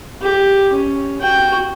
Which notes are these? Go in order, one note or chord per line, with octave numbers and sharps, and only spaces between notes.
G4
C#4
F#4 G5